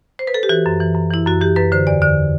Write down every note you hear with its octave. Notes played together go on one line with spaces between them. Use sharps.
C5
B4
A4
G4
E3 F#4
F#2
E3
F#2
E3 E4
F#2 F#4
E3 G4
F#2 B4
D3 C5
E2 D5
D3 D5